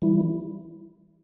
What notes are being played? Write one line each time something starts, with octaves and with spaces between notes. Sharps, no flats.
E3 G3 E4